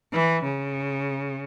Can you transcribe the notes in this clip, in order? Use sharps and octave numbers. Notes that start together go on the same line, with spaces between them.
E3
C#3